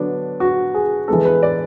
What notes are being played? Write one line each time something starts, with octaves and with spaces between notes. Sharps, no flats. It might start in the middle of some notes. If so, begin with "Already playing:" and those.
Already playing: D3 F#3 B3 D4
F#4
G#4
E3 G#3 B3 A4
B4
D5